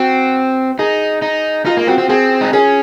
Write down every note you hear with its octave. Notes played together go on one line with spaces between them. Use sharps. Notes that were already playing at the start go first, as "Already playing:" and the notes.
Already playing: C4 F#4
D#4 G#4
D#4
D#4 F4
A#3
C4 F#4
C4
C4 G#4
D#4
C#4 G#4